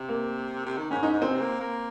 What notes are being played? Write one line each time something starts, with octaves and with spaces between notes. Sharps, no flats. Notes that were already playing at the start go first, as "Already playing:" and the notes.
Already playing: C3
A#3
C3
D#3
G#2 C#4
G#2 D#4
G#2
A#2 C4
C3
A#3
A#3